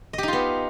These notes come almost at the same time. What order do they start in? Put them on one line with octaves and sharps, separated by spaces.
D#5 G4 D#4 F4 B3